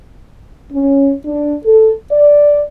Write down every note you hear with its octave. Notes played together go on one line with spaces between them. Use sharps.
C#4
D4
A4
D5